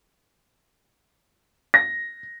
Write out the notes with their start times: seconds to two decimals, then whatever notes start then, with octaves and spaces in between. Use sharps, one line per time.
1.74 A#6